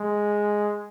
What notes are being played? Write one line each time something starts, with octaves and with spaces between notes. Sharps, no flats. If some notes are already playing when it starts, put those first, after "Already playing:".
Already playing: G#3